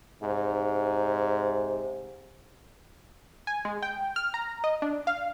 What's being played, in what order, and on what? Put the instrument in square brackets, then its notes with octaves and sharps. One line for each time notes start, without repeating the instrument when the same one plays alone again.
[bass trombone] G#2 [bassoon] C3
[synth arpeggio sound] G#5
G#3
G5
F6
A#5
D#5
D4
F5